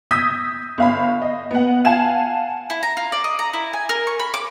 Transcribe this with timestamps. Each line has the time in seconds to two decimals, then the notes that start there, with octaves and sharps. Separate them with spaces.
0.11 D#6 E6 G6 G#6 A#6 B6
0.78 G1 F5 B5
1.22 D#5
1.51 B3 F#5
1.85 F5 F#5 G#5 A5 G#6 E7
2.70 E4
2.83 A#5
2.97 F4
3.12 D5
3.24 D#5
3.39 A#5
3.53 E4
3.73 G#5
3.89 A#4
4.07 C#6
4.19 B5
4.34 D6